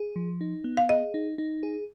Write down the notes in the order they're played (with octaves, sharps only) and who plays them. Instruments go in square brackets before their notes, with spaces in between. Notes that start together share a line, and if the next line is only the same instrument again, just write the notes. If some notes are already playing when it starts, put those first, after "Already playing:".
Already playing: [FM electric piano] G#4
F3
D#4
B3
[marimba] F5
[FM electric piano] G#4 [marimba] D#5
[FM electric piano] D#4
D#4
G#4